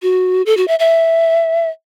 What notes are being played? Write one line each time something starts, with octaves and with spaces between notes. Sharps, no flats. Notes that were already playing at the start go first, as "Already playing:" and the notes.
F#4
A4
F#4
E5
E5